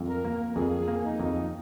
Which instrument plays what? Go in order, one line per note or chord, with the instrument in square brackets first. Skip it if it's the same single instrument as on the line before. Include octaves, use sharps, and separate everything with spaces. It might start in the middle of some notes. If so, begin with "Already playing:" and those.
Already playing: [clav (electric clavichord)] F2
[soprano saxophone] A#4
[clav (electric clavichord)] A#3
[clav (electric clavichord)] F2 [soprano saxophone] G#4
[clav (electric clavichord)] A#3
[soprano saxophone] D#4
[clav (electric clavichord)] F2